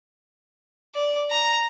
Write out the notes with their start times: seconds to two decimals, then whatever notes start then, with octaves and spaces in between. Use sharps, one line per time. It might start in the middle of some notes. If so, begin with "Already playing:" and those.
0.95 D5
1.31 A#5